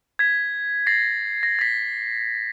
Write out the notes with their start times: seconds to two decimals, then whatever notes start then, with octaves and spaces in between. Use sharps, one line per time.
0.19 G#6 B6
0.87 A6 A#6 C7
1.43 A#6
1.59 A6 B6